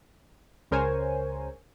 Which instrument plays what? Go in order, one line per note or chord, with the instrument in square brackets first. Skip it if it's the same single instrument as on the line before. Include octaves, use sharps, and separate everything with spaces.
[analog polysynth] C#2 C#3 A#4 C5 C#5 G#5